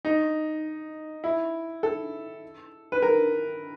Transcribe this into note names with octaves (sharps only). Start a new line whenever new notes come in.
D#4
E4
A4
B4
A#4